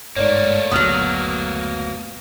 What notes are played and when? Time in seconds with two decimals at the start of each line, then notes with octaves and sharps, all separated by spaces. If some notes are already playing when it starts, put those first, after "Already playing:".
0.16 G1 G#2 A3 A#3 C#5 D5
0.71 F#1 D2 A#2 F#3 B3 D#6 F6